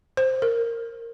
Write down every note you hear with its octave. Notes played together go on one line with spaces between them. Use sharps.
C5
A#4